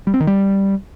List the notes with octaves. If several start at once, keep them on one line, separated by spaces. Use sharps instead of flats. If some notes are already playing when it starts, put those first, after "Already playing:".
G3
C4
D#3
G3